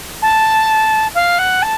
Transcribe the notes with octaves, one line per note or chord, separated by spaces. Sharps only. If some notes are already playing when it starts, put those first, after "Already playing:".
A5
F5
F#5
A5